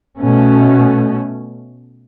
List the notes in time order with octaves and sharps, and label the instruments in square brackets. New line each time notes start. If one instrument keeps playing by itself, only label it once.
[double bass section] B2 A3 C#4